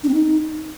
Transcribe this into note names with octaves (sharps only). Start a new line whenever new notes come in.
D4
C4
D#4